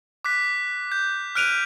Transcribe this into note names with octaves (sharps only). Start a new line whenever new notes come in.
D6 F#6 B6
G6
F6 F#6 D7 D#7 F7